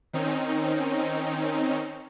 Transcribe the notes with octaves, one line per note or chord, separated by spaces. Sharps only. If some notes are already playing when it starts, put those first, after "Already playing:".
D#3 C4 C#4 D#4